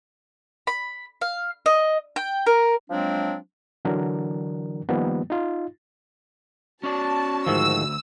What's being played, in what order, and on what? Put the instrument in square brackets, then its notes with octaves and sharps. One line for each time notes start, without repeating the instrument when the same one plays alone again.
[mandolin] B5
F5
D#5
G5
A#4
[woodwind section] F3 F#3 G#3 C4 D4
[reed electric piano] D3 E3 F#3 D4 A#4
D#3 F3 G3 A#3 B3
D#4 F4
[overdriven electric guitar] C#4 D5 [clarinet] F#4 [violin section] A5
[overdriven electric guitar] D2 [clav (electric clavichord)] G#2 D#3 F3 [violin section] E6